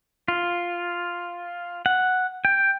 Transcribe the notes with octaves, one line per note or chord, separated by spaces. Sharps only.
F4
F#5
G5